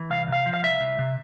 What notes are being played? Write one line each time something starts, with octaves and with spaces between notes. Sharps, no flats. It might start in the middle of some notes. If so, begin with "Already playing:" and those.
Already playing: E3
C2 F5
C3 F5
F3
F5
C2 E5
C2
C3